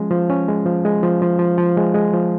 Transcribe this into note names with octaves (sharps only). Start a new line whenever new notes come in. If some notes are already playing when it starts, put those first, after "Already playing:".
Already playing: F3 G#3 C#4
F3
C#4
G#3
F3
G#3
F3
F3
F3
F3
G#3
G#3
F3